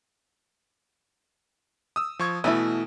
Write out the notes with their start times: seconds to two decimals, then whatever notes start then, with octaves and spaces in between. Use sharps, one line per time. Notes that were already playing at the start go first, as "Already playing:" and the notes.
1.96 D#6 E6
2.19 F3 C#6 G#6
2.44 B2 E3 A3 E4